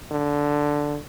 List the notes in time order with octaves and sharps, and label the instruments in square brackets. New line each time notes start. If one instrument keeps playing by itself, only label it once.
[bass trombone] D3